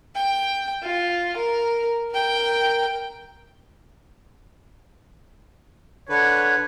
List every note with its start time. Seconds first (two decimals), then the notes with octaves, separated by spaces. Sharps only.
0.15 G5
0.83 F4
1.37 A#4
2.11 A#4 G5
6.09 D3 D4 B4 C#5